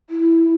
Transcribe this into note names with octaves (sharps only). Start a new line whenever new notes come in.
E4